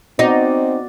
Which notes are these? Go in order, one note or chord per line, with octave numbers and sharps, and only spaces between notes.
B3 C4 D#4 F#4 D5